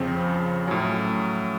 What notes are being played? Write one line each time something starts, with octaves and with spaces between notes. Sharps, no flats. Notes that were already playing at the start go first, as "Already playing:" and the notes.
Already playing: F2 C#3 F3 C4
A2 F#3 C#4